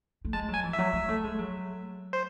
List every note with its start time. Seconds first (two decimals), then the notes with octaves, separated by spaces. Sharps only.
0.25 A3
0.33 G#3 A5
0.48 F#3
0.54 G#5
0.64 E3
0.73 E5
0.78 F#3
0.93 G#3
1.09 A3
1.24 G#3
1.39 F#3
2.13 C5